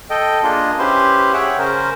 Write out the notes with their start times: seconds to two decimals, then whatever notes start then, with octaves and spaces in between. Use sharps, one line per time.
0.10 A4 D#5 G5
0.43 A#3 D4 F4 G#4 D#5
0.78 C#4 E4 G4 B4 C5 C6
1.33 G#4 C#5 E5 F#5 G5
1.58 C#3 C#4 A#4 C5